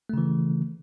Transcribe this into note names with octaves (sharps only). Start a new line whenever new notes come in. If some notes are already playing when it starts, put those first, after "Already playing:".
C#3 E3 A3